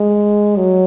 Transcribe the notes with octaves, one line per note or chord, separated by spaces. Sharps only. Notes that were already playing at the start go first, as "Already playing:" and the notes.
Already playing: G#3
F#3